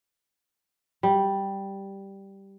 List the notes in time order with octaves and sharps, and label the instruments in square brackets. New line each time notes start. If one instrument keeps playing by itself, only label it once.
[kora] G3